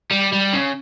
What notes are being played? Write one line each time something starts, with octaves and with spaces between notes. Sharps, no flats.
G3
G3
C#3